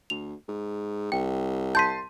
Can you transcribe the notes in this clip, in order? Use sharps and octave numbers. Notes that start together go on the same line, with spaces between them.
D2 F7
G#2
C2 G5
A5 C6 G6 B6 D#7